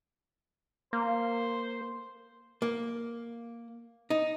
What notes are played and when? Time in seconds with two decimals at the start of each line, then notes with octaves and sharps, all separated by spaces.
0.93 A#3 C5
2.62 A#3
4.10 D#4